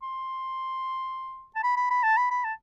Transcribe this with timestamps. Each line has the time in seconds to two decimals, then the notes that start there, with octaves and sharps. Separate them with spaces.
0.02 C6
1.56 A5
1.63 B5
1.77 B5
1.90 B5
2.03 A5
2.17 B5
2.31 B5
2.44 A5